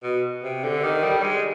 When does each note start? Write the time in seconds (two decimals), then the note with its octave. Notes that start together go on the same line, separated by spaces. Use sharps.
0.03 B2
0.43 C3
0.64 D3
0.84 D#3
1.03 G3
1.23 G#3